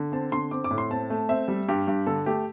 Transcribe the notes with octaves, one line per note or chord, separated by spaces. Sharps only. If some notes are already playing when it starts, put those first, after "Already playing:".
Already playing: D3
C4 A5
D3 C6
C4 D6
D6
A2
C6
C4 A5
A3
C4 E5
G3
G2 G4
G2
D3 A4
A3 G4